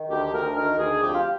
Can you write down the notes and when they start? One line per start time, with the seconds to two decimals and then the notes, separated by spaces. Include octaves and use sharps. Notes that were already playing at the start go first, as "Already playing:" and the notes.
Already playing: D#3
0.09 D2 G4
0.32 D2 A#4
0.55 D#3 A#4
0.78 D2 G#4
1.01 F2 G4
1.13 F4